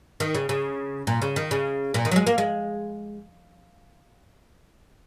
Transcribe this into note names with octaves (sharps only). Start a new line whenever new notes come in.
D#3
C#3
C#3
A#2
C#3
D#3
C#3
A#2
D#3
F#3
G#3
A#3
G#3